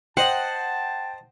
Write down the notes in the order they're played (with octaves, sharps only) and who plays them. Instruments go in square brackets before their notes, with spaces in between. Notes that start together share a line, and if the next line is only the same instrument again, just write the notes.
[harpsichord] C5 D#5 [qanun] F#5 [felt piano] G5 [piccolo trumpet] A5